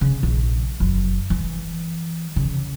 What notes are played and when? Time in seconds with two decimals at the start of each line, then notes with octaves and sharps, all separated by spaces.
0.01 C#3
0.23 A#1
0.80 F#1
1.30 E3
2.36 C#3